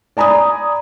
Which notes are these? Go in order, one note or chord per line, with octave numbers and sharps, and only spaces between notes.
D5 G#5 A#5 B5 D#6